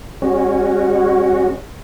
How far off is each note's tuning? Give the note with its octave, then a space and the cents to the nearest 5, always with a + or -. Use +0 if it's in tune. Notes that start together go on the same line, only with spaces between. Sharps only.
G3 +40 C#4 -20 F#4 +0